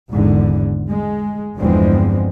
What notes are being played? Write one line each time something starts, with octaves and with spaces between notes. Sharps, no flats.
G#1 E2 G#2 D3
G#3
G1 E2 D3 F3 G#3 C4